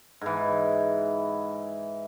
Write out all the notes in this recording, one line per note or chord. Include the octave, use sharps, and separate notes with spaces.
G#2 E3